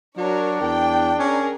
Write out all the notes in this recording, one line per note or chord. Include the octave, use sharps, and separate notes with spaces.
F#3 D4 A#4 C#5
E2 G5
C#4 G#4 A#4